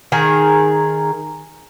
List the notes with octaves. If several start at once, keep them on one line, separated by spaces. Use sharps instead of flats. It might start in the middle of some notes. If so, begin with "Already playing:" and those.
D#3 G#4 A#4